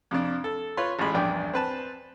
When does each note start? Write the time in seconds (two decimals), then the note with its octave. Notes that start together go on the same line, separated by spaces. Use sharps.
0.11 F2 C3 D4
0.44 A4
0.77 F4 B4 C#5 B5 C6
0.99 A1 A2 G#3 B5
1.14 A#1 E2 G2 D5 G5
1.53 C4 B4 A5